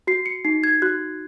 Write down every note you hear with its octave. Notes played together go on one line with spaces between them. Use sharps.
F#4 C7
C#7
D#4 C7
G#6
F#4 F#6